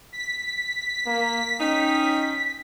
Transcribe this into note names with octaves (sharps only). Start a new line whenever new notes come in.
B6
A#3
C#4 D#4 G5